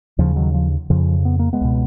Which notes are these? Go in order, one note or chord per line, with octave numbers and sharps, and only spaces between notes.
D#2 C#3 F3
D#3 F#3
F3
F2 C#3 F3
B3
A#3
G#3 B3
C#2 B2